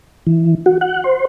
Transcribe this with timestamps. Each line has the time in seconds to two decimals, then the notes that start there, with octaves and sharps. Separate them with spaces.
0.27 E3
0.66 F#4
0.81 F#5
1.04 C5